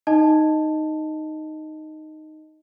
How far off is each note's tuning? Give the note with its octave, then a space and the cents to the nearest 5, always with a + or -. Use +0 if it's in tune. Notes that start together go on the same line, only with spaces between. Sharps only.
D#4 -5 D#5 +0 A5 +0